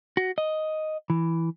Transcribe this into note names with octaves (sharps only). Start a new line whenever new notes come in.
F#4
D#5
E3